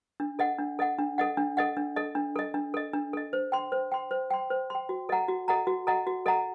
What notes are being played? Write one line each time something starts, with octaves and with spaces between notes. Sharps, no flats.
D4
A4 D#5 F#5
D4
A4 D#5 F#5
D4
A4 D#5 F#5
D4
A4 D#5 F#5
D4
A4 D#5
D4
A4 D#5
D4
A4 D#5
D4
A4 D#5
C5
G5 C6
C5
G5 C6
C5
G5 C6
C5
G5 C6
F#4
A4 D#5 F#5 A#5
F#4
A4 D#5 F#5 A#5
F#4
A4 D#5 F#5 A#5
F#4
A4 D#5 F#5 A#5